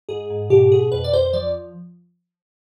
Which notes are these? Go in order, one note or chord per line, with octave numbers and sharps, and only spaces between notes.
G#2 G#4
G#2
B2 G4
B2 G#4
F2 B4
D5
F2 C5
F3 D5